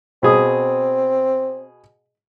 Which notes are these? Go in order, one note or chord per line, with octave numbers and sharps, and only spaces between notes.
B2 C4 G#4 D#6